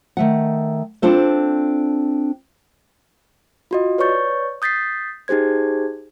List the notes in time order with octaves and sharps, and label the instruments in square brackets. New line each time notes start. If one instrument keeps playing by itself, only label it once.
[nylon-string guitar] D#3 A3 F#5
C4 D4 F4 A4 C5
[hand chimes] F4 F#4 D#5
B4 C#5 D5 C#6 G6 A6
D#6 G6 A6 B6 C7
D#4 G4 G#4 C5 G#6